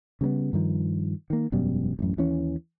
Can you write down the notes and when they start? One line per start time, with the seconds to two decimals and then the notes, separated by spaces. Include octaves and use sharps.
0.21 C#3 G3 A#3 B3
0.53 G2 D#3 F3
1.30 D#3 A#3
1.52 E1 F#2 B2 G3
1.99 A1 F#2
2.17 D#2 E3 C#4